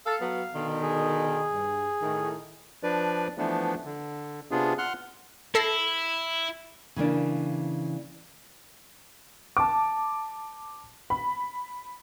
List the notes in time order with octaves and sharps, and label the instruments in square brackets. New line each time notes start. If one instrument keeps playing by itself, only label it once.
[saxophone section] A4 [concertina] F5
[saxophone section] F#3 B3
B2 D3 D#3
[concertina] G#4
[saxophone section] G2
A2 D#3
[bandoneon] F3 D4 B4 D5
E3 F3 A3 B3 D4
D3
C3 B3 D4 F4 G#4
F#5 C6 F6 F#6
[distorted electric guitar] E4 [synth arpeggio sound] A4 A#6 C7
[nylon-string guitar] C#3 E3 A#3 D4
[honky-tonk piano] A5 D6
B5